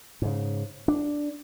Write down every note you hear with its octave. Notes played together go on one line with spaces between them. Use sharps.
G#2 C#3
D4